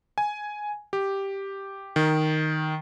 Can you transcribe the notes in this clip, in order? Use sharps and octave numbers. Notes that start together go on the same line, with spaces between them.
G#5
G4
D#3